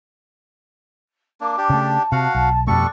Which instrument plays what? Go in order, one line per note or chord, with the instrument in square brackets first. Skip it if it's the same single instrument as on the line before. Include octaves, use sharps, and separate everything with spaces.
[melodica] A#3 D4 [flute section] D6
[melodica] D4 G4
[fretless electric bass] C#3 A3 [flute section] A5
[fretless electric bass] C3 [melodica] F#4 F5 F#5
[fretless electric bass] B1 [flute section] A5
[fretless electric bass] F2 B2 A3 [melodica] G3 A4 C#6 [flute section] D4